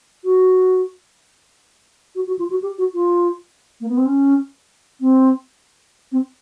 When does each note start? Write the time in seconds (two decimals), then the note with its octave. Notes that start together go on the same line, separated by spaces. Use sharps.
0.24 F#4
2.15 F#4
2.27 F#4
2.39 F4
2.50 F#4
2.62 G4
2.78 F#4
2.94 F4
3.81 A#3
3.89 B3
3.97 C4
4.06 C#4
5.01 C4
6.12 C4